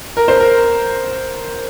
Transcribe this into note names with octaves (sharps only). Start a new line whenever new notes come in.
A#4
C5
A#4